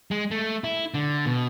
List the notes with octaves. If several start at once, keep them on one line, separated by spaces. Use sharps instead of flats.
G#3
A3
E4
D3
B2